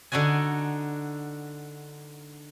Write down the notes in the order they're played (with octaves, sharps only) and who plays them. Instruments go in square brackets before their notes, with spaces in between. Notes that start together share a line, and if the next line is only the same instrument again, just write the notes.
[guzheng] D3 D4 D#4 F#4 G#5